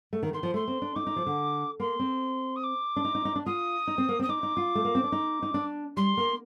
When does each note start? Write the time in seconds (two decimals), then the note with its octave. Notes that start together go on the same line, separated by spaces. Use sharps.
0.13 A3
0.23 D#3
0.33 D#3 C6
0.43 F3
0.54 A3 C6
0.68 C4
0.82 D4
0.95 D#4 D6
1.07 D#4
1.16 F3
1.26 D3
1.80 A#3 C6
1.99 C4
2.56 D#6
2.63 D6
2.96 D4
3.05 D#4
3.15 D#4
3.25 D#4
3.35 D4
3.45 F4 D#6
3.87 D#4
3.98 C4
4.09 A#3
4.19 C4
4.22 D#6
4.29 D#4 D6
4.43 D#4
4.57 F4
4.75 A3
4.85 A#3
4.95 C4
5.04 D4
5.12 D#4
5.42 D#4
5.54 D4
5.96 G3 C6
6.17 A#3